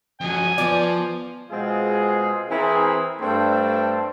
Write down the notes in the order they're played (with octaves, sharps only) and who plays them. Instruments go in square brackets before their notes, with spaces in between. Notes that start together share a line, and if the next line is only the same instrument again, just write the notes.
[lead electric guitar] F2 F#3 [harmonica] G#5
[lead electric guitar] F3 [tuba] B3 [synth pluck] D5 D6
[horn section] B2 G#3 C4 F4 G#4
E3 C4 E4 G#4 A#4
G2 A3 C4 D4 A4